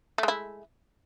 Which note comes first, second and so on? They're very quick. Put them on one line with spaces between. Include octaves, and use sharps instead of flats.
A3 G#3 E4